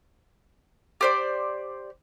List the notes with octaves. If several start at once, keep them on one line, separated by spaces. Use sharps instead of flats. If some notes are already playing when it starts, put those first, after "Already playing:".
G4 C5 D5